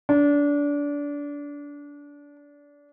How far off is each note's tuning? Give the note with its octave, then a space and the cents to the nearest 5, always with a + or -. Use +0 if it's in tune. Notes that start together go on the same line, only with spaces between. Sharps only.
D4 -25